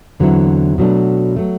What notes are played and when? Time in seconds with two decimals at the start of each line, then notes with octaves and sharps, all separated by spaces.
0.20 E2 D3 F#3 C4 E4
0.78 B2 F#3 A3 D4
1.36 F#3 A3